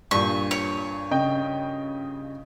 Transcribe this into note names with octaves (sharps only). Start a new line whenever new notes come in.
G2 A#2 C#6
C#5
C#3 D#5 G5